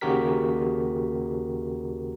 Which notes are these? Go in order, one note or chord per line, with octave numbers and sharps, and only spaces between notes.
D#2 C#3 F#4 G4 A#4 B6